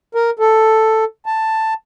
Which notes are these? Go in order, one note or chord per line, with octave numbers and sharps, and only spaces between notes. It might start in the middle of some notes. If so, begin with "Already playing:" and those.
A#4
A4
A5